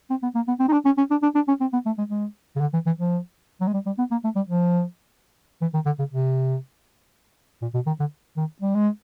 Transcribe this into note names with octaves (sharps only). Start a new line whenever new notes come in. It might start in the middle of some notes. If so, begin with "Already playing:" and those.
C4
B3
A#3
B3
C4
D#4
D4
C#4
C#4
D4
D4
D4
C#4
C4
B3
A3
G#3
G#3
C#3
D3
E3
E3
F3
F#3
G#3
G3
G3
B3
A#3
A3
G3
F3
E3
D#3
D3
C#3
C3
A#2
B2
D#3
D3
D#3
G3
G#3